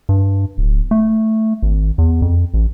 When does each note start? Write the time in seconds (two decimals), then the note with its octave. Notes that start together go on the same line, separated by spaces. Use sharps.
0.09 G2
0.58 D1
0.91 A3
1.62 G#1
1.98 E2
2.22 F2
2.54 A1